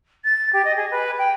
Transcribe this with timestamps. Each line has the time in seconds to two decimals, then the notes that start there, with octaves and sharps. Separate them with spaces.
0.24 A6
0.53 G4
0.65 D#5
0.76 G#4
0.91 B4
1.18 G5